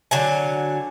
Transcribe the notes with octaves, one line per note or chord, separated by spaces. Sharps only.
D3 F#3 G#5